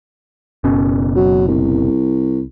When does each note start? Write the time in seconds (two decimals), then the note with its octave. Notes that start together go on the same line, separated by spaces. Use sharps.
0.64 F#1 B2 C#4
1.16 F#3
1.47 C2